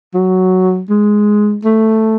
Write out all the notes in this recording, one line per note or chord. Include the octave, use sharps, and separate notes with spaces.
F#3
G#3
A3